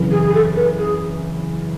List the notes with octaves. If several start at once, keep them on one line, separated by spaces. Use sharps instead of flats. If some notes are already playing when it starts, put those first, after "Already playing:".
Already playing: F#2 C#3 E3
G#4
G#4
A4
B4
G#4